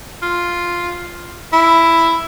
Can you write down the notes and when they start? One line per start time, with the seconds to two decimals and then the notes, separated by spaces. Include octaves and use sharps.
0.22 F4
1.53 E4